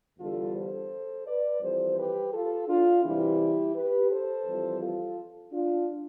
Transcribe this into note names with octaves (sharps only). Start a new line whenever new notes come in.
E2 D3 G3 F4 A4
A4 C5
B4 D5
F2 E3 G3 A4 C5
G4 B4
F4 A4
D4 F4
E2 C3 E3 G3 E4 G4
G4 B4
A4 C5
F2 E3 G3
F4 A4
D4 F4